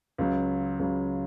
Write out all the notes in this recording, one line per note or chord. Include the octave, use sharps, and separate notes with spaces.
C#2 C#3 F#3
C#2 C#3 F#3